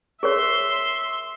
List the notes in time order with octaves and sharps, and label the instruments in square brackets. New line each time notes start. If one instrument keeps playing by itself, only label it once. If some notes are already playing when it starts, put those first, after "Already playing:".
[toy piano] G#4 A#4 C#5 [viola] E5 C6